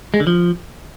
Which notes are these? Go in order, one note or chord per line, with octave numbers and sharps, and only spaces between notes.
G#3
D3
F3